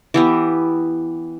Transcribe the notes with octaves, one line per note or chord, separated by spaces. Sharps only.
E3 B3 G4